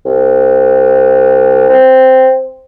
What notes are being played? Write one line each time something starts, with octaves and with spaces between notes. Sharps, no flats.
C2
C4